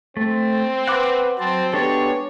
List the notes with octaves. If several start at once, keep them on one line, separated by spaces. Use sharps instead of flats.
A3 C4
B4 F#5 D6
F#3 C4 C5 A5
G#3 B3 D4 G4 A4 C#5